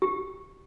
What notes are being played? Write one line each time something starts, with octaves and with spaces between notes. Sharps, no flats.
G4